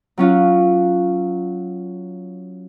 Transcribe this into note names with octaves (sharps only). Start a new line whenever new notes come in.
F#3 C#4 F4 F#4